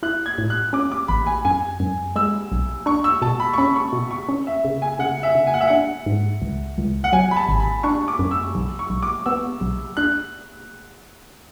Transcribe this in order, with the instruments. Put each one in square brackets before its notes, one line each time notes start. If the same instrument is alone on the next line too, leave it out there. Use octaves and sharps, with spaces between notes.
[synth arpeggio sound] E4 [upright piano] F#6
[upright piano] G#6
[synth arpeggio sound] A2
[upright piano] F#6
[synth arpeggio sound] C#4 [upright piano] D6
[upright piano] D6
[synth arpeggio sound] A1 [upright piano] B5
[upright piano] G#5
[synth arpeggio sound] F#2 [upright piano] G#5
[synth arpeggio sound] F#2
[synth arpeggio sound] G#3 [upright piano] E6
[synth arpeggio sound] B1
[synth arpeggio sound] D4 [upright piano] C#6
[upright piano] E6
[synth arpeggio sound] B2 [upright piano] A5
[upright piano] B5
C#6
[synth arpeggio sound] C#4 [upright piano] B5
[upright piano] C#6
[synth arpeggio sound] B2
[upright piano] C#6
[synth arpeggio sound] C#4
[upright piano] E5
[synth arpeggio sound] C#3
[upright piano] G#5
[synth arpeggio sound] C#3 [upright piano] F#5
[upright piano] E5
[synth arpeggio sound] C#3
[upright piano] G#5
F#5
E5
[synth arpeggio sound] D4 [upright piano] F#5
[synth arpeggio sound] G#2
C#2
C#2
[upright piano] F#5
[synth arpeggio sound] F#3 [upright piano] G#5
[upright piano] B5
A5
[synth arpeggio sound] G#1
[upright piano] B5
[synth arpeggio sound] D4 [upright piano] C#6
[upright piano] D6
[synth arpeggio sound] F#2
[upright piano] E6
[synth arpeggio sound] B1
[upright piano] C#6
[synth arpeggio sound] B1
[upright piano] D6
[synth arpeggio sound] B3 [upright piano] E6
[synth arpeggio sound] B1
[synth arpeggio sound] D4 [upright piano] F#6